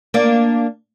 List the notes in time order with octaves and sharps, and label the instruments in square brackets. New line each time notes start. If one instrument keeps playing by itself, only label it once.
[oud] A#3 D4